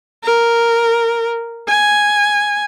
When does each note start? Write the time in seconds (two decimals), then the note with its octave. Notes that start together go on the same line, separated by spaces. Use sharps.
0.23 A#4
1.68 G#5